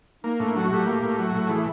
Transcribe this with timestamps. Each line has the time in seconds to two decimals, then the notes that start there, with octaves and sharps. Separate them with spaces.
0.24 A#3 D#4
0.40 A2 D4
0.55 F#3 D4
0.64 F#4
0.71 A2 G4
0.86 A#3
1.02 A2
1.19 F#3
1.34 A2
1.49 E3 G#4